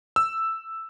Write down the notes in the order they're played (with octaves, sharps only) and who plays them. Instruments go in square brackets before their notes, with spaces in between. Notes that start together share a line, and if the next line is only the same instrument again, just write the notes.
[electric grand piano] E6